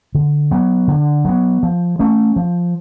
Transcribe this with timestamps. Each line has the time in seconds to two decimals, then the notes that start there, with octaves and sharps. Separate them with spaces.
0.15 D3
0.51 F#3 B3
0.88 D3
1.25 F#3 B3
1.63 F3
1.99 A3 C#4
2.36 F3